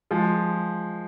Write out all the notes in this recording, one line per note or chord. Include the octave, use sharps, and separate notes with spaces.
F3 G#3